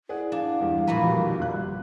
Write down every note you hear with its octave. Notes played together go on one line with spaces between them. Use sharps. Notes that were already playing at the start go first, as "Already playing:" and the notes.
E4 G#4 D5 F#5
D4 F5
E2 G2 G4
F2 A#2 F#4 B4 A#5
F2 B2 D#3 G4
G1 F#6